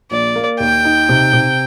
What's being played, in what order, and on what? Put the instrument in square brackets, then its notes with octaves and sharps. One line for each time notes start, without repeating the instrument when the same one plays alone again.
[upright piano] A#1 [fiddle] D5
[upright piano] A#3
[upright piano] D#2 [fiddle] G5
[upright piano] D#4
C3
C3